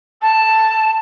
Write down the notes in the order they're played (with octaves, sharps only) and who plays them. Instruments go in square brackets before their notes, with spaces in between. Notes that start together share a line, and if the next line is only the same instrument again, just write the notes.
[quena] A5